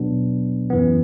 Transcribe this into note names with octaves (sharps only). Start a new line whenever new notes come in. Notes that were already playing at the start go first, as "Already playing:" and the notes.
Already playing: B2 F#3 B3 D4
F#2 E3 B3